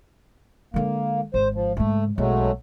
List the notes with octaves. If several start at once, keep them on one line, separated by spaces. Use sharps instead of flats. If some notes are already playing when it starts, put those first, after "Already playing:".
D3 G#3 A#3
G#1 C5
F3
G#2 C#3 A3
B1 F#3 G#3 A3